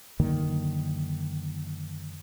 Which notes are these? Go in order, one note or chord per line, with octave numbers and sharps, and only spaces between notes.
F#2 D3 D#3 A#3